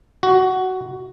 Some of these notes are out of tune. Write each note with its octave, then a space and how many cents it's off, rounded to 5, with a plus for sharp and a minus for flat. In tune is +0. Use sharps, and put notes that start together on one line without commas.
F#4 +10